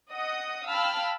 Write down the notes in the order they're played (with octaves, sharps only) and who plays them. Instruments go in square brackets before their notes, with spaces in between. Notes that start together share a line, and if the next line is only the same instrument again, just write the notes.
[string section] D#5 F#5 D#6
F5 G5 A5 B5 E6 F6